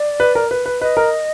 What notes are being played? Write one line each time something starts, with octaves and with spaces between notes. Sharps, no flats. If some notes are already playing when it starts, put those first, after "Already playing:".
Already playing: D5
B4
A#4
B4
B4
B4 D#5
A#4